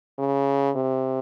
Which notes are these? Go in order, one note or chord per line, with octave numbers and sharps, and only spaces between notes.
C#3
C3